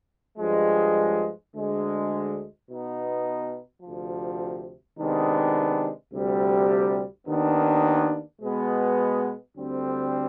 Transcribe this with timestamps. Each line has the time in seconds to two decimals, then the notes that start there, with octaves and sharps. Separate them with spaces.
0.38 G2 F3 G#3
1.53 D2 D3 G#3
2.69 B2 B3 D#4
3.83 D2 C3 F3
4.98 C3 D#3 G#3 B3 D4
6.12 D2 C3 G3
7.27 D#2 D#3 B3 D4
8.42 B2 G#3 B3
9.56 D2 D3 G3 C4